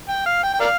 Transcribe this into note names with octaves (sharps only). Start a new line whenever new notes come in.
G5
F5
G5
G5
A#4 D5 F5